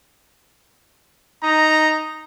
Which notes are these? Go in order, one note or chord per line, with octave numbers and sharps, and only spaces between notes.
D#4 A#5